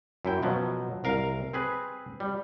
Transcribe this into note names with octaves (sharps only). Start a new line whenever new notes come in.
F#2 E4 G5
B2 F3 F#3
C2 A#4 F5
C4 G#4 B4
G3